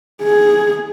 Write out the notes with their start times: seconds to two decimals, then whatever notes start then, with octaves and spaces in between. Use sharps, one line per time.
0.23 G#4